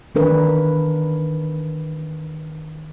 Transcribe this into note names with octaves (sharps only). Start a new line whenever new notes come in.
D#3 E3 D4 A#4 B4